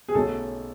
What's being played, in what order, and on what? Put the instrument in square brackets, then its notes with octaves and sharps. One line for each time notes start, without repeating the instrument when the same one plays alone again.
[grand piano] G#4
B1 B2 A3 C#4 A4